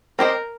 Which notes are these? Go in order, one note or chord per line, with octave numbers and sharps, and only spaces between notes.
C4 G4 A#4 C5 D#5